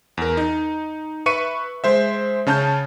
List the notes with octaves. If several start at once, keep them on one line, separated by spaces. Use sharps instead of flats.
E2 A#4
D#4
B4 E5 C#6 C#7 D#7
G#3 C5 E5
C#3 C#4 A5 F6 G6